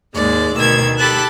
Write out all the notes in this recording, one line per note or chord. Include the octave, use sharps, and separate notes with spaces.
D#2 G#2 G#3 D5
D2 B2 D#3 E6 G#6
G4 A4 A5 B5 F#6